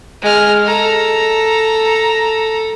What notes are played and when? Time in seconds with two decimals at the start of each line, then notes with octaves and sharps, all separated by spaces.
0.22 G#3 F6
0.65 A4 A#5